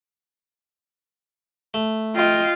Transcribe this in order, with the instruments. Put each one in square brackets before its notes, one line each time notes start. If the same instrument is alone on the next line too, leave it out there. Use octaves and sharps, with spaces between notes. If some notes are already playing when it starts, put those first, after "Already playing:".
[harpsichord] A3
[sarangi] F4 [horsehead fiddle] D#5 G5